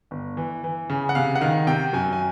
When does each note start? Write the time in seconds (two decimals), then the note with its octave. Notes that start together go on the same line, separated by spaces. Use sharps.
0.11 G1
0.37 E3
0.64 E3
0.90 C#3
1.09 F#5
1.15 C3 F5
1.35 F#5
1.41 D#3 F5
1.67 C3 G5
1.93 F#2 G#5
2.12 G#5